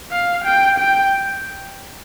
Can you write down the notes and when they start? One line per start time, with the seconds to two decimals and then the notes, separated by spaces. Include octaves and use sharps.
0.12 F5
0.45 G5
0.79 G5